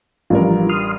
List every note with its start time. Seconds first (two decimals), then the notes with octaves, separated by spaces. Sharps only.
0.30 A1 G2 F3 F4 A#4
0.69 C6 D#6 F6